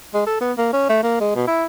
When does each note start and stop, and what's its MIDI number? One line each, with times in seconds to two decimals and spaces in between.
0.14 0.22 56
0.26 0.38 69
0.40 0.52 59
0.58 0.71 58
0.73 0.85 61
0.89 0.98 57
1.03 1.17 58
1.20 1.32 56
1.35 1.43 47
1.47 1.65 64